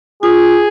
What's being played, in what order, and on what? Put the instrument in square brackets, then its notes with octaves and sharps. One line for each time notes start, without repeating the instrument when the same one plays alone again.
[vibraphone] F4 [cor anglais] G#4